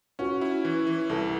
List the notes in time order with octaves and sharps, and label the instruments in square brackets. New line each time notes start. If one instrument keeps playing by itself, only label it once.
[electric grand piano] C#4 [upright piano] F#4
[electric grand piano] E4
E3
E3
[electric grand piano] C2 [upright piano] A4